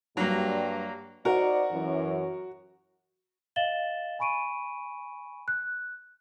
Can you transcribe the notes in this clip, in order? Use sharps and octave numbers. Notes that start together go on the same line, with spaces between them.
G2 F#3 G3 A#3
D#4 F#4 A#4 C5 D5
F#2 E3
D#5 F5 A6 E7 F#7 G7
G#5 B5 C#6 D7 D#7
F#6